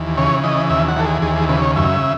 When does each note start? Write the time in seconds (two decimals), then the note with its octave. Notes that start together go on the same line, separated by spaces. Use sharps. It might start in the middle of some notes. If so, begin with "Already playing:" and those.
Already playing: D#2 E3
0.17 C#3 C#5
0.44 E3 D#5
0.70 D#2 E5
0.88 F#5
0.96 E3 A4
1.05 G#4
1.22 D#2 G#4
1.36 G#4
1.49 C#3 B4
1.62 C#5
1.76 F#2 E5